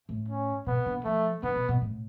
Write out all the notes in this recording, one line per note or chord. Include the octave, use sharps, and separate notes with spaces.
A2
C#4
B2 B3
D3
F3 A3
D3 B3
B2
B2
A2